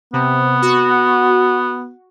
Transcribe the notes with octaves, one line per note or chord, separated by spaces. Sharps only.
C3 B3
F#4